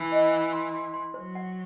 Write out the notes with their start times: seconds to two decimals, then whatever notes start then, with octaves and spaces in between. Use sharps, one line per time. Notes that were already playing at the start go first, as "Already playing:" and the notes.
Already playing: E3 A5
0.12 D#5
0.32 F#5
0.52 C6
0.74 C6
0.94 C6
1.14 F#3 C5
1.35 F#5